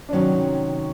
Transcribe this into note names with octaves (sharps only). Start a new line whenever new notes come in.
D4
C3 D#3 F#3 C#4